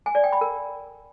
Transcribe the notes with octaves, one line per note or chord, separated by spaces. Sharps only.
G#5
D5
G5
B5
A#4